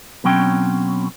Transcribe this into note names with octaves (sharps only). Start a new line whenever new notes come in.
B2 F#3 C4 C#4 G5